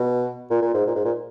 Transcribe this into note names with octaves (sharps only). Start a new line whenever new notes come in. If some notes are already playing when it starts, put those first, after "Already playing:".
Already playing: B2
A#2
A#2
G#2
A#2
G#2
A#2